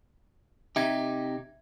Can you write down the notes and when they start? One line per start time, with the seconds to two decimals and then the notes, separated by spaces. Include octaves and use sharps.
0.76 C3 D#4 G4 E5 G#6